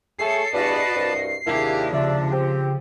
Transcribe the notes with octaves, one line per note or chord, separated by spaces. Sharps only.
A3 G#4 A4 C#5 C7
E2 G2 F#4 B4 D5 D#5 A5
C2 G2
D#2 C3 A#3 D4 E4 G4 G#4
C#3 F3 D5 E5
C4 G4